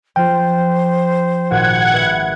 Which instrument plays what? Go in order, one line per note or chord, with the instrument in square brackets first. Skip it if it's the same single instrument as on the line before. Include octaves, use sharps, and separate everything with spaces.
[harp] F3 F4 [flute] C5 [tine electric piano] G5
[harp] G#1 A#2 F#4 [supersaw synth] F#5 G#6
[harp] B4 E5